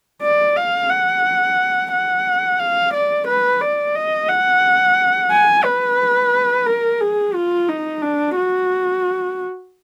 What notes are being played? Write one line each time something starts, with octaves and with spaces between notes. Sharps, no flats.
D5
F5
F#5
F#5
F5
D5
B4
D5
D#5
F#5
G#5
B4
A#4
G#4
F4
D#4
D4
F#4